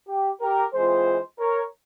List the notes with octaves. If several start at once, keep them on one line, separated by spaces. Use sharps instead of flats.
G4
G4 A#4
E3 G#3 C4 F4 G#4 C5
A#4 C#5